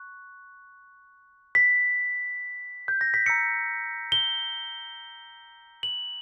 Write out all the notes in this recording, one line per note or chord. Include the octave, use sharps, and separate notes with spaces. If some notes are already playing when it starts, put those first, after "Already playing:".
Already playing: C#6 F#6
B6
G6
A#6
B6
A#5 E6 G6 C#7
G7
F#7